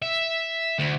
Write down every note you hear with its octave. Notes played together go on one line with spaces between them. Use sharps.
E5
D2